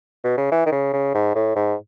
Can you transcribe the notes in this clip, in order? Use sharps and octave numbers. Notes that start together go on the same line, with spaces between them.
B2
C#3
E3
D#3
C#3
C#3
G#2
A2
G#2